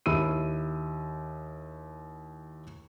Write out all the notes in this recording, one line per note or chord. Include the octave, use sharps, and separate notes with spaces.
D#2 E4 E6 D#7